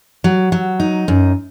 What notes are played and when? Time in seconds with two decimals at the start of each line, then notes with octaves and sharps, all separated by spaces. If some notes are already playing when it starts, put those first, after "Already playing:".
0.24 F#3
0.52 F#3
0.80 D#4
1.08 F#2